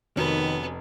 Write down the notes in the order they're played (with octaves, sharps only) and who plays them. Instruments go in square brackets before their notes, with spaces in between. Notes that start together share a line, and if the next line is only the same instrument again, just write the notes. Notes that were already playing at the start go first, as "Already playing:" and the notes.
[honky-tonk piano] F1 [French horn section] D#3 [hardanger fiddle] B3 [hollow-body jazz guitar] C#4 F#4 B4